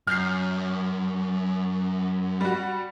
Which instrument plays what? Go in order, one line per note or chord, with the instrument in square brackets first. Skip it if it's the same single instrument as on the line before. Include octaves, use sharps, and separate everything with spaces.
[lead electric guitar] F#2 [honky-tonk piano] F6 G6 C7
[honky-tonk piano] G3 F#4